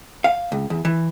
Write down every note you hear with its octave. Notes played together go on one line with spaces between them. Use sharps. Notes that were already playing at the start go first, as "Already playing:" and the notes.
F5
C#2
E2
E3